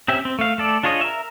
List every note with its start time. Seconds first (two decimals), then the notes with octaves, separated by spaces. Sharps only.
0.08 C4 C#4 G4 E5
0.25 C4
0.39 A3 F5
0.58 A3 A4 D5
0.83 D4 F4 G#4 C#5 D#5
1.01 A#4 E5